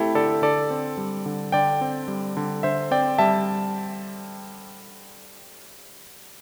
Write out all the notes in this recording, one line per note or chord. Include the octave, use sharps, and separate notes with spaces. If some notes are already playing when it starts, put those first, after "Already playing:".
Already playing: A3 C4 E4 G4 A4
D3 A4 D5
D3 A4 D5
C4
G3
D3
D3 D5 G5
C4
G3
D3
D3 C5 E5
C4 D5 G5
G3 E5 A5